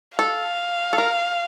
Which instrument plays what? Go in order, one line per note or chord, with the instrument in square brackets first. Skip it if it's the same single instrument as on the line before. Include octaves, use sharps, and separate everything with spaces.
[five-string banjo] A4 [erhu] F5
[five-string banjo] A4
A#4